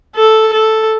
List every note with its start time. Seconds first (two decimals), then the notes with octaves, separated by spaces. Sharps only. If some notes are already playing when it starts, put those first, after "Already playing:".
0.15 A4
0.53 A4